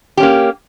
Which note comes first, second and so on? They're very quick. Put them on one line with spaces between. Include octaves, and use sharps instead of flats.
G4 C#4 A#3